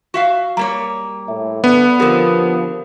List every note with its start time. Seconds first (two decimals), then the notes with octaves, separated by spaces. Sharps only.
0.14 F#4 E5 F5
0.57 G3 A#3 C#5 A#5
1.28 A2 E5
1.64 D3 B3
2.00 D3 F3 C4 G4 A#4 D#6